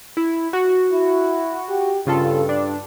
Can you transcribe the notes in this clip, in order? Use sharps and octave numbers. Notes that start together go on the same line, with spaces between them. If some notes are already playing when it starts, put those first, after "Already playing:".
E4
F#4
E4
G4
G2 C#3 F4 A4
D4